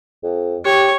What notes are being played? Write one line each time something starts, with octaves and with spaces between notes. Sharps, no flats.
F2
G4 C#5